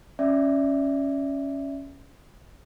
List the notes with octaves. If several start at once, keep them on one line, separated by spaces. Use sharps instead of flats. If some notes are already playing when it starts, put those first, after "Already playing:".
C#4 D5 E5